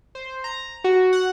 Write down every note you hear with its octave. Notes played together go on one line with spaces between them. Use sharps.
C5
A#5
F#4
F#5